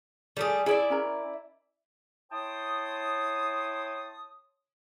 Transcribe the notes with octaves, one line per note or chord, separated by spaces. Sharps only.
G3 A3 G#4 D5
E4 G#4 D5 E5
C#4 A#4 A#5
E4 C#5 G5 A5 C6 D#6